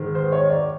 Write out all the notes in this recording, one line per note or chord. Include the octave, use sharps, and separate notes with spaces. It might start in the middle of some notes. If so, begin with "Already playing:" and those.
Already playing: G#2 D#3 G#3
C5
C#5
D5